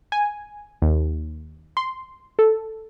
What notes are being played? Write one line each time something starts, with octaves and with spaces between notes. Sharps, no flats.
G#5
D#2
C6
A4